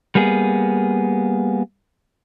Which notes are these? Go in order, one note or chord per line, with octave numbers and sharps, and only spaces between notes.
G3 A#3 B3 G#4